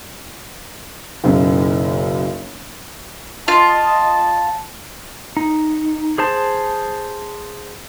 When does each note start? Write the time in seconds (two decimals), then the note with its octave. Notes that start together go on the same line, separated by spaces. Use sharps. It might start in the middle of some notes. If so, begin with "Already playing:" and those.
1.24 F#1 B1 F#2
3.48 F4 D#5 A5
5.37 D#4
6.18 G#4 C5 A5